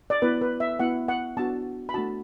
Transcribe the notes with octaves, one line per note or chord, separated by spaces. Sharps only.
D5
B3 E4 B4
B4
E5
B3 E4 F#5
F#5
B3 D4 F#4 A5
B5
A3 D4 F#4 A5